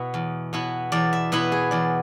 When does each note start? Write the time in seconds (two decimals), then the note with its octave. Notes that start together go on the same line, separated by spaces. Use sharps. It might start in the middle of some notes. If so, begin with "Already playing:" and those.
Already playing: B2 B3 E4
0.14 E2
0.53 B2 B3 E4
0.92 E2 D5
1.13 E5
1.32 B2 B3 E4 B4
1.52 G#4
1.71 E2 D5